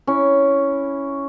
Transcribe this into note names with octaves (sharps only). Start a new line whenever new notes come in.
C#4 E4